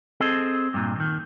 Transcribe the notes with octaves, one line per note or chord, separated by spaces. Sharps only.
C4 G#4 A4 D#5
G2 A#2
D#2 D#3